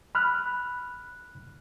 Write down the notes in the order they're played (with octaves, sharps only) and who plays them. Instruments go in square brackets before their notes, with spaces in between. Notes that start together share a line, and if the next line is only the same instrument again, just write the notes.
[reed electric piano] B5 F6 F#6